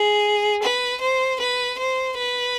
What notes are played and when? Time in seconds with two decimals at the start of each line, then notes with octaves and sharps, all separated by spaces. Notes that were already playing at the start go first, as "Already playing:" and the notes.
Already playing: G#4
0.62 B4
1.01 C5
1.40 B4
1.79 C5
2.18 B4